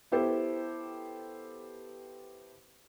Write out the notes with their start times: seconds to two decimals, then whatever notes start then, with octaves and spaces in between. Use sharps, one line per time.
0.12 B3 E4 G4 A4 C5